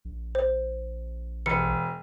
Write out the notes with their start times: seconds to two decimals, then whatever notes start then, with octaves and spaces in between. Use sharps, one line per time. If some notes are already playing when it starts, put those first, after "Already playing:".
0.05 A#1
0.35 C5
1.46 E1 C#7